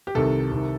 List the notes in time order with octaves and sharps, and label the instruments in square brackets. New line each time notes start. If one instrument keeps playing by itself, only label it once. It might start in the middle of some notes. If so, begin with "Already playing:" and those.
[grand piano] G4
C2 C3 D#3 A4
C2 C3 D#3